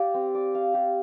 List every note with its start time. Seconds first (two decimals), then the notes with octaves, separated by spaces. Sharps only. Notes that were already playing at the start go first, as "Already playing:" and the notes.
Already playing: G4 D5 F5
0.14 C4
0.35 D5
0.55 F5
0.74 G4